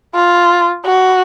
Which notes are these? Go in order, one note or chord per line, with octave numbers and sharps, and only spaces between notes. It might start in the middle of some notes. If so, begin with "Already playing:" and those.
F4
F#4